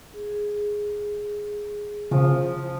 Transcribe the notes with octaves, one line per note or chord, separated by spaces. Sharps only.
G#4
C#3 F3